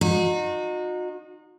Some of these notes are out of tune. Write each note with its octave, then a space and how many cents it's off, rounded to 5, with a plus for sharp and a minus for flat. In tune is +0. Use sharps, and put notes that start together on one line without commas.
D#4 -20 F#4 -40